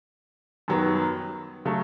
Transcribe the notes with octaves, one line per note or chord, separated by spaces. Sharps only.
F#2 D#3 F#3 B3
C#3 F#3 A3